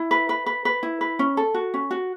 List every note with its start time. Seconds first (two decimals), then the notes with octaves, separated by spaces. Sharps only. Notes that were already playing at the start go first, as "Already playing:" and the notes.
Already playing: E4
0.11 B4
0.29 B4
0.46 B4
0.65 B4
0.83 E4
1.01 B4
1.19 C#4
1.37 A4
1.54 F#4
1.74 C#4
1.91 F#4